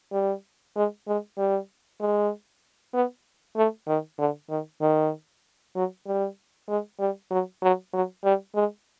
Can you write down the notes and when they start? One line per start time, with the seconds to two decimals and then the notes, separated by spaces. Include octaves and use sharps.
0.13 G3
0.76 G#3
1.08 G#3
1.38 G3
2.00 G#3
2.94 B3
3.57 A3
3.88 D#3
4.19 D3
4.50 D#3
4.81 D#3
5.75 F#3
6.07 G3
6.69 G#3
6.99 G3
7.31 F#3
7.62 F#3
7.93 F#3
8.24 G3
8.55 G#3